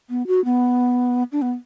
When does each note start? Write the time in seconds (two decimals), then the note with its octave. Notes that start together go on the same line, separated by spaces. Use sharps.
0.10 B3
0.27 F#4
0.45 B3
1.32 D4
1.42 B3